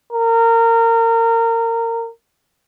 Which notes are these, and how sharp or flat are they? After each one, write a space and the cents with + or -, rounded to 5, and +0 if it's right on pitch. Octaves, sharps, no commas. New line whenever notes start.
A#4 -25